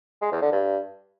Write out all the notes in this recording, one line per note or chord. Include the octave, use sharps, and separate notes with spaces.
G#3
E2
D3
G2